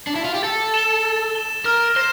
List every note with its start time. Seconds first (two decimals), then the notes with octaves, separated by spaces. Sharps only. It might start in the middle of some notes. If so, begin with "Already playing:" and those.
0.07 D4
0.16 E4
0.25 F4
0.34 G4
0.43 A4 A6
0.74 E7 G7
1.05 A6
1.35 E7 G7
1.65 A#4 F6
1.96 C5 A#6 E7 G7